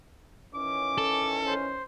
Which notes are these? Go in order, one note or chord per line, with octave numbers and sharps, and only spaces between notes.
D#3 E3 C#4 D6
A4
C5